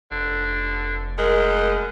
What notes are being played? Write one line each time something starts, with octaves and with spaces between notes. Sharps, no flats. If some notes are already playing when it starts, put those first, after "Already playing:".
F1 D3
F#2 G#3 A#4